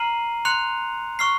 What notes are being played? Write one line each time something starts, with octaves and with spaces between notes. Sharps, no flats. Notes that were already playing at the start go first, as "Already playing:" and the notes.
Already playing: A#5 F6 C7 D#7 F#7
C6 F#6 C#7 F7
C#6 F6 C7